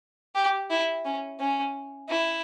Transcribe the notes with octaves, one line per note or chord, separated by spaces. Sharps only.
G4
E4
C#4
C#4
E4